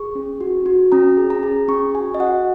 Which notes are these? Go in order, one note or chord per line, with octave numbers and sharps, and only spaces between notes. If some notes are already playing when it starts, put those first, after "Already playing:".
Already playing: G#4 C#6
C#4
F#4
F#4
C#4 A#5
G#4
A#5
G#4
C#4 C#6
F#4 G#5
D#5
F#4 F#5